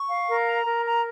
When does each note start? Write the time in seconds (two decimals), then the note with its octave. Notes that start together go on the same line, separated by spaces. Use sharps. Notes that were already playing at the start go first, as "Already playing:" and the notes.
Already playing: C#6
0.09 F5
0.27 A#4
0.46 A#5
0.66 A#4
0.85 A#5